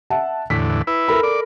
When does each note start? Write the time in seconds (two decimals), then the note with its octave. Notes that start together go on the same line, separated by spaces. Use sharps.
0.10 E5 F#5 A5
0.50 E2 A2 D3 B6
0.87 E4 B4
1.08 A4 A#4 B5
1.23 D5